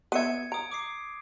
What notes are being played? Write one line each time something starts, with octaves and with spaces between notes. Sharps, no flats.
B3 E5 G#6 C#7 D#7
A#5 D#6 D7
D6 D#6 C7